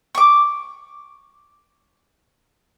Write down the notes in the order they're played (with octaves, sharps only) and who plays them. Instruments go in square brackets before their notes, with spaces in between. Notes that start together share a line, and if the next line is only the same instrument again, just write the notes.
[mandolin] C#6 D6